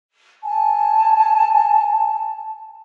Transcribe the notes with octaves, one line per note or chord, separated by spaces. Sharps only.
G#5 A5